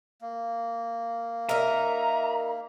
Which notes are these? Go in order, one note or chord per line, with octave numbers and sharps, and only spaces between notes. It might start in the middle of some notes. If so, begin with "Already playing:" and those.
A#3
D#4 A#4 E5 A#5